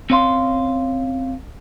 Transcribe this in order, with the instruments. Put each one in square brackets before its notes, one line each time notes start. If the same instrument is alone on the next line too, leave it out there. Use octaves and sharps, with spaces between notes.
[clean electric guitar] C4 C#4 C#5 F5 C6